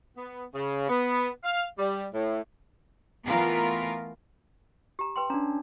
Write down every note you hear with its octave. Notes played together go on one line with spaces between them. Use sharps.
B3
C#3
B3
F5
G3
A2
E3 A3 B3 F4 A#4
G4 A#5
B4 G5 C6
C#4 D4 A#5